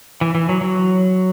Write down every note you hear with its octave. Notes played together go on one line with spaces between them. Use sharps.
E3
E3
F#3
F#3